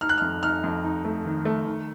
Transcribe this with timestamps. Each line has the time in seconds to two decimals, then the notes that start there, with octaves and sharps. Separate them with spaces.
0.01 D#4 F6
0.09 F#6
0.18 F6
0.22 F2
0.43 D#4 F6
0.64 F2
0.84 D#4
1.05 A3
1.25 D#3
1.45 A3
1.66 D#3